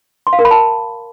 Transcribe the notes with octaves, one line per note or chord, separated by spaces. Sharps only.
C6
F5
A#4
B5
A5